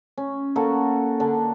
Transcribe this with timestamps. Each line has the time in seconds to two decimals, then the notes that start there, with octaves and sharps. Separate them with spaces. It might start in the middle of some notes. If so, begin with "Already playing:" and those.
0.18 C#4
0.56 A#3 C#4 F#4 A4
1.20 D3 D4